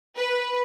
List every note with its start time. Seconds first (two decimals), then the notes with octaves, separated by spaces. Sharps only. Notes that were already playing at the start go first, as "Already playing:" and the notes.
0.17 B4